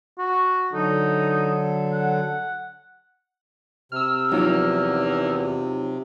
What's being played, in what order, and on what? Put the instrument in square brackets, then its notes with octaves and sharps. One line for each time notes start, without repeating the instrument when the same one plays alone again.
[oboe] F#4
[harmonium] D3 F#3 A4 [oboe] D#4
[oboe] F#5
[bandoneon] C3 [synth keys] E6 F6
[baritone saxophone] E2 [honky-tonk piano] F3 F#3 D#4